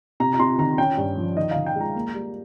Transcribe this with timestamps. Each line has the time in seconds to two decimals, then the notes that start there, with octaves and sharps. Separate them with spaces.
0.20 C3 A#5
0.33 A#5
0.39 C3 C6
0.58 D#3 A#5
0.78 C#4 G5
0.97 G2
1.17 F3
1.37 D#3 D#5
1.51 D#3 F5
1.66 G5
1.76 G#3 A#5
1.95 A#3
2.14 G3